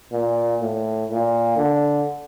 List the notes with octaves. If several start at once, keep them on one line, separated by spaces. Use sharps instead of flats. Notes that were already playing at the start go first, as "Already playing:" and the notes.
A#2
A2
A#2
D3